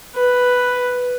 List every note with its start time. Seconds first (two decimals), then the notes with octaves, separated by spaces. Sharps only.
0.15 B4